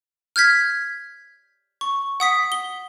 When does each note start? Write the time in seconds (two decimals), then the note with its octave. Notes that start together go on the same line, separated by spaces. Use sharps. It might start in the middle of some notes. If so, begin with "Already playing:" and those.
0.36 F6 G6 G#6 B6
1.81 C#6
2.20 F#5 D#6 B6
2.52 G7